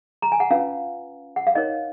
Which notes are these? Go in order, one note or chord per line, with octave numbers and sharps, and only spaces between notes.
A#5
G#5
F#5
C#4 F4 B4 F5
F#5
F5
D#4 A#4 C#5 D#5